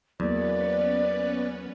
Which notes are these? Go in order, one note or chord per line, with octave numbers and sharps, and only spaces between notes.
E2 F#3 A#3 B3 C#4 B4 D5